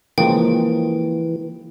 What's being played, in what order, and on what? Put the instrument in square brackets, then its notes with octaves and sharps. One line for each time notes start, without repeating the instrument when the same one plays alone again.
[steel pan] C#3 F3 G#3 [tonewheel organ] E3 [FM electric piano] A#3 [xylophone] G5